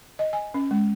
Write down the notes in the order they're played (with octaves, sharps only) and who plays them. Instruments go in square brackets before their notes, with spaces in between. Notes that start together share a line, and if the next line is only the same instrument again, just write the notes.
[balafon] D#5
G#5
C#4
G#3